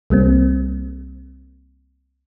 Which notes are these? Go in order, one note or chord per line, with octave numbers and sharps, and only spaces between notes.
C2 G3 A#3 C4